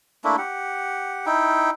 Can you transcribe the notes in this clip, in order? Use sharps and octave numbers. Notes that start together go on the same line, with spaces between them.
A3 A#3 D4 E4
G4 F#5
D#4 E4 G5